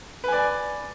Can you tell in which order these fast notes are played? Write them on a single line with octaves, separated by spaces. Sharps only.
B4 G#5 D5